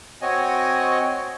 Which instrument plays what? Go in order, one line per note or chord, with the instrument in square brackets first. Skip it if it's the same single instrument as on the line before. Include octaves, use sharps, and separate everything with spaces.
[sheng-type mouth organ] C4 F#4 C#5 D#5 G#5